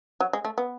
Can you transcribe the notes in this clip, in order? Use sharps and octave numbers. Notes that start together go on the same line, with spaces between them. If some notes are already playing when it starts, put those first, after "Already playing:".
F#3
G#3
A3
B3